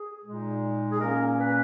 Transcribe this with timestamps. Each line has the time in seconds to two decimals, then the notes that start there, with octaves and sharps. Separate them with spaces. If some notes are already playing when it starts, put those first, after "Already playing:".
Already playing: G#4
0.25 A#2 G#3 D#4
0.92 G#4
1.00 A#2 A#3 C#4 A#4
1.38 B4